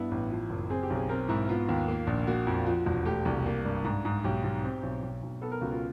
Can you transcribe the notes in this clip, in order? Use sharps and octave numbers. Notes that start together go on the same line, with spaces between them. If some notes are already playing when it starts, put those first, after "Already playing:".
Already playing: G2 B3 E4
A1
F3
F#1
C4 G#4
G4
B1
G#4
C4 A#4
G#2 E4
B3 F4
D#2
A#3
A#1
A#3 F#4
F2
F3
E1
A3 G4
C2
A#3
G2
G#2
G#2
B1 G4
B1
C4
B1
B1
B1
B3 A4
A#4
C#2 F#4
F4